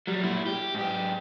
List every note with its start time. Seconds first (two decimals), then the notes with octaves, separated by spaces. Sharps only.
0.07 F#3 G3
0.23 A#2 E4
0.46 G4
0.75 G#2 G4